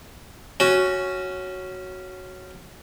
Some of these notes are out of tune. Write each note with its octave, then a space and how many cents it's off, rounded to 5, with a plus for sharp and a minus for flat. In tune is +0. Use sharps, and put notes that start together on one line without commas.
C#4 +0 F#4 +0